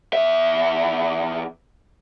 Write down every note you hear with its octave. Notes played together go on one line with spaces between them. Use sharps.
E2 E5